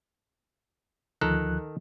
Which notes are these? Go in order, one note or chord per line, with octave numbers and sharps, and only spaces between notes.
D2 D#3 F3 A4 A#5 F#6